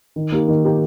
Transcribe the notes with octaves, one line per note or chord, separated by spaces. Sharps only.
D#3
A#3 D#4 G4
D#3
A#3 D#4 G4